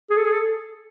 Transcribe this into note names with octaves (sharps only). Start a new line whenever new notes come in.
G#4
A4
G#4
A4